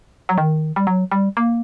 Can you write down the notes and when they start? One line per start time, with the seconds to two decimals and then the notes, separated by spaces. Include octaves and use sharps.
0.29 F#3
0.38 D#3
0.76 G3
0.87 F#3
1.12 G3
1.37 A#3